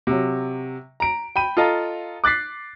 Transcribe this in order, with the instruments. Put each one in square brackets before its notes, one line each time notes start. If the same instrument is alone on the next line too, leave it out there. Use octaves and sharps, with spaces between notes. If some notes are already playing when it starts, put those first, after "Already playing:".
[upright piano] C3 F#3
A#5 D7
G5 B5 D#7
F4 A4 D#5 F5 A#5
D6 F#6 A6 B6 C7